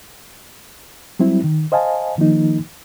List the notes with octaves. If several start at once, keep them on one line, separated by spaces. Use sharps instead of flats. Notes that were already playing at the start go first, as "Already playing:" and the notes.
F#3 G3 C4 E4
D#3
C5 D#5 F5 G#5 A5
D#3 F3 A#3 D#4